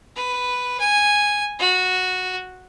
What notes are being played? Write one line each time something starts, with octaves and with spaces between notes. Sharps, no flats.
B4
G#5
F#4